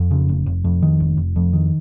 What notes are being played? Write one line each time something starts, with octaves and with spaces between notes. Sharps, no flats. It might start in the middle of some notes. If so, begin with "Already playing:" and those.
Already playing: F2
C#3
F1
F1
F2
D#3
F1
F1
F2
D#3